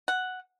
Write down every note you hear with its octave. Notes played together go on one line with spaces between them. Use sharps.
F#5